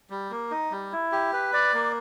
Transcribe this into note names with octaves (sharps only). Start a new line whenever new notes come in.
G3
A#3
D#4
G3
E4
G4
B4
D5
A#3